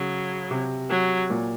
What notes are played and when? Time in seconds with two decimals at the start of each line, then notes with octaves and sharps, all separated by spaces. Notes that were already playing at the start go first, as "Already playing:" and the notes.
Already playing: C#3 F#3
0.51 C3
0.91 F#3
1.30 A#2